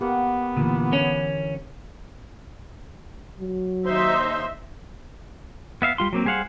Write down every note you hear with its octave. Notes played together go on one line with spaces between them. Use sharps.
A#3 B3 G4 F#5
A#2 D3 E3
C#4
F#3
D#2 D#4 C5 E5 C6
B3 E5 F5
G3 F4 C6
F#3 A#3 C4
G3 G#4 C5 F5 F#5